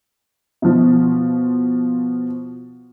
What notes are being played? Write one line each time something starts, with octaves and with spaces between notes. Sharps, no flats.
B2 F3